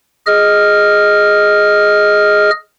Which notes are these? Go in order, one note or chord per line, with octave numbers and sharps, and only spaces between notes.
G#4 D#5 F6